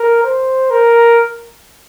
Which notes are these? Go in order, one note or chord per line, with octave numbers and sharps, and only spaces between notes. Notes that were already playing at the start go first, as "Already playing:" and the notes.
Already playing: A#4
C5
A#4